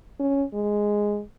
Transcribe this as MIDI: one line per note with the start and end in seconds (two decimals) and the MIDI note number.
0.19 0.44 61
0.54 1.21 56